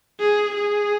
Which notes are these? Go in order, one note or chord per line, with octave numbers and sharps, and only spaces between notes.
G#4
G#4